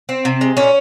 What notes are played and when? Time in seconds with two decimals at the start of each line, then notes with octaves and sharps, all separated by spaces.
0.09 C4
0.25 C3
0.41 G#3
0.57 A#2 C#4